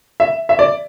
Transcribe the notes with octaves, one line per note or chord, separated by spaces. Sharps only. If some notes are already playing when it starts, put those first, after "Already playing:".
E5
E5
D5